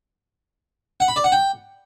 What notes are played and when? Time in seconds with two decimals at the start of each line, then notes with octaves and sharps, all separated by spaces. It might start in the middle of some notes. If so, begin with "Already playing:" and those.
1.00 F#5
1.08 B5
1.16 D5
1.24 F#5
1.32 G5